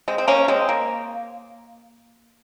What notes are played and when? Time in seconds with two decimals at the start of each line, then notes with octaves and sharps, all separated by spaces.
0.08 G#3 C4
0.18 C4
0.28 A#3 C#4
0.44 A#3
0.48 G#3 C4
0.69 A#3